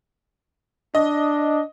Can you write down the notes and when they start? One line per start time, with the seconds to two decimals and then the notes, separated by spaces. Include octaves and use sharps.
0.95 D4 D#5